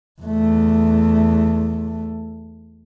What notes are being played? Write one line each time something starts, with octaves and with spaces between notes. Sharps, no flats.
E2 A3